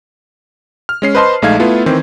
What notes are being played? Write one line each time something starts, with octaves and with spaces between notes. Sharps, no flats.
F6
G#3 C#4 C7
B4 C5 D#5 A5 C6
A#1 G#3 A3 D#4 F5 G#6
A3 B3 E4 F4
D#3 E3 C4